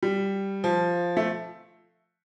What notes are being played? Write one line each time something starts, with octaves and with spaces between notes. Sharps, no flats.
G3
F3
A3